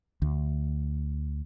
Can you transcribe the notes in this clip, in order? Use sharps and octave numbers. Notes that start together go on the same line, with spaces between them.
D2